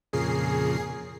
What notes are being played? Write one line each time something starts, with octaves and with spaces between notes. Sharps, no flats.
F2 A#2 C#3 G#4 C7